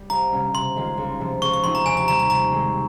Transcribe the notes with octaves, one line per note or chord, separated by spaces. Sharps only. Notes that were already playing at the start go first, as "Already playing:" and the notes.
Already playing: G3
C2 A#5
C3 G3 A#3 C#4
C3 C6
D#3 G#3 C#4 F4
C#2
C3 F3
C#2 C#6
C#6
C3 F3 C4 D#4 C6
A#5
D#2 G#5
A#5
D#3 G3 A#5
A#5
C3 A#5
D#3 G#3 C4